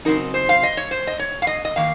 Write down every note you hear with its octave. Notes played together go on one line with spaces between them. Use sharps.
C#3 F#3 C4 D#4 A#4
C5
F5
D#5
C#5
C5
D#5
C#5
F5
D#5
D#5
D#3 A#3 F5